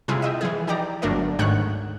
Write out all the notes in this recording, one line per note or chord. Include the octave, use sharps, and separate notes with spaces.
C3 G3 E4 F4 G#4
D#5 E5 G5
E3 F3 G#4
D#4 G4 D5 A#5
G1 F#3 A3 D4 A#4 D5
D2 G#2 D#3 C#5 F#5 F#6